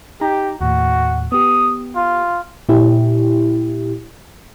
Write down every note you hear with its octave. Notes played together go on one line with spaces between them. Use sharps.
D#4 G4 A#5
D#2 A2 F#4
B3 G4 D#6
F4
A#2 E4 G4